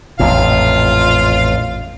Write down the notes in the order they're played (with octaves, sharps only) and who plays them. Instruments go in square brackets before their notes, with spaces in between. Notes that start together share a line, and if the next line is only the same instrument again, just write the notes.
[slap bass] A1 F2 A#2 [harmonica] F4 F5